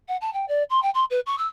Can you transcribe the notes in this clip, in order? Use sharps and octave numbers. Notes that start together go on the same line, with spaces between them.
F#5
A5
G5
D5
C6
G5
C6
B4
C#6
E6